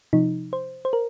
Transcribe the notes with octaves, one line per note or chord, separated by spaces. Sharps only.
C3 F3 D#4
C5
C5
A#4